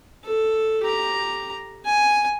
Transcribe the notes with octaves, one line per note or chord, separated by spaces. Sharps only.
A4
G4 A#5
G#5